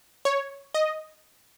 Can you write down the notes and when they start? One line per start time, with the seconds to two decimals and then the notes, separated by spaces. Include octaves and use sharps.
0.25 C#5
0.74 D#5